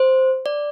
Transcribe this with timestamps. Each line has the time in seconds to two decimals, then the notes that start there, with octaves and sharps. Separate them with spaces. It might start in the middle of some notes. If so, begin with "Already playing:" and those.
Already playing: C5
0.46 D5